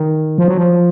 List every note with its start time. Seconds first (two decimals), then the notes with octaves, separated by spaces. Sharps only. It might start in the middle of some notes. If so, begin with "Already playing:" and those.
Already playing: D#3
0.38 F3
0.48 F#3
0.58 F3